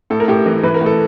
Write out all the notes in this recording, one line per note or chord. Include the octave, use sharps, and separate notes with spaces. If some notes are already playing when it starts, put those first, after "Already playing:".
A2 A4
A#4
A2 G4 A4
E3
E3 B4
A#4
A2
A4